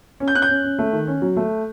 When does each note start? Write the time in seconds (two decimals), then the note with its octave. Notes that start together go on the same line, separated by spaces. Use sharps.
0.20 C#4
0.28 G6
0.35 C#4 F#6
0.42 G6
0.49 C#4
0.64 C#4
0.79 A3
0.93 D#3
1.07 C#4
1.22 F#3
1.36 A3